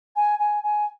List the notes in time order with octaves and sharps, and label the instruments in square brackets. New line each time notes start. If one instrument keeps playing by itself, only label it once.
[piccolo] G#5
G#5
G#5